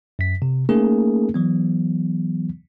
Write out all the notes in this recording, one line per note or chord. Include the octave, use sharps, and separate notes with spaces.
F#2 B6
C3
A3 A#3 C#4 D#4 G#4 A#4
E3 F#3 B3